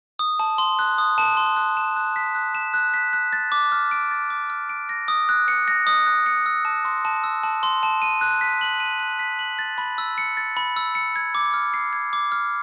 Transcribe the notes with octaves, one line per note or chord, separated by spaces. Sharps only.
D#6
A5
C6
F#6
D#6
A5
C6
F#6
E7
F#6
B6
F#6
E7
F#6
B6
F#6
A6
D6
F6
D7
A6
D6
F6
D7
A#6
D#6
F#6
C#7
A#6
D#6
F#6
C#7
E6
A5
C6
A5
E6
A5
C6
A5
D#7
F#6
B6
F#7
D#7
F#6
B6
F#7
A6
B5
E6
C#7
A6
B5
E6
C#7
G#6
D6
F6
C7
G#6
D6
F6